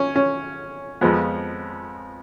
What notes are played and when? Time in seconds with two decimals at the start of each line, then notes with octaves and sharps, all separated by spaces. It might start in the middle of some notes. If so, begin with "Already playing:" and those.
Already playing: C#4
0.16 C#4
1.01 F2 F3 G#3 B3